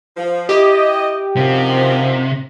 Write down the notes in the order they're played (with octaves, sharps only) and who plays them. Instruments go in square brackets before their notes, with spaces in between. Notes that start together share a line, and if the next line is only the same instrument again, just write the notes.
[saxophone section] F3
[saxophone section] E4 D#5 [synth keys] G4
[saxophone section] F#2 D#3 F3 [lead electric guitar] C3